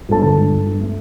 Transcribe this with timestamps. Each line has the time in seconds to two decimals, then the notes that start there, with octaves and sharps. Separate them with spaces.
0.09 G2 A4 A5
0.22 D3 A4 A5
0.37 G2
0.52 G2
0.66 G2
0.80 A3